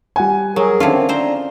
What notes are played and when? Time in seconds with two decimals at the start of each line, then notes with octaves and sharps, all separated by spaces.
0.16 G3 F#5 G#5
0.56 F#3 G#4 A#4
0.80 D3 D#3 C4 C#4 E4 F4 A4
1.09 C4 D4 C5 A#5